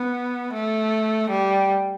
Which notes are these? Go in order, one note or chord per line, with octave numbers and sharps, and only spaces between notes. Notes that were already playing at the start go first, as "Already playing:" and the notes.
Already playing: B3
A3
G3